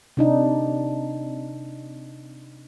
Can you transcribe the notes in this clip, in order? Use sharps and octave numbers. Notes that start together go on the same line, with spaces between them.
C3 D4 D#4